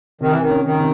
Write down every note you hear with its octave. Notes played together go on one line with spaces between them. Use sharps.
C3 D#3
E3
D#3
C#4
D#3
C3